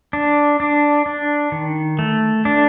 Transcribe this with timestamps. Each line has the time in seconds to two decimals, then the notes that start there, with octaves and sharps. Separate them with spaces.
0.13 D4
0.60 D4
1.06 D4
1.52 D#3
1.99 A3
2.45 D4